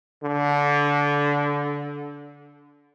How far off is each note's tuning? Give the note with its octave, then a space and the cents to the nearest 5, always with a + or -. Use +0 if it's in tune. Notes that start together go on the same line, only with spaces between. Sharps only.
D3 -20